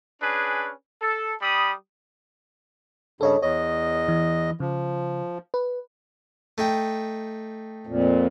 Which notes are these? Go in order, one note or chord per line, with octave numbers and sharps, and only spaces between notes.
C#4 D4 G#4 B4
A4
G3 B5 D#6
G2 C#3 A4 C#5 D#5
E2 C#5 D#5
E3
C#3 F3
B4
A3 D#4 G5
F2 A#2